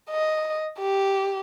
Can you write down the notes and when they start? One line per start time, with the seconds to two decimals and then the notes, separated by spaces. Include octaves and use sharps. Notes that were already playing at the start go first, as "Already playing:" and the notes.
0.10 D#5
0.79 G4